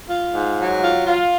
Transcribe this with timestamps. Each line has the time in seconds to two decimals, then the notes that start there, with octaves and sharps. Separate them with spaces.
0.09 F4
0.34 G#2
0.58 F#3
0.83 F4
1.06 F4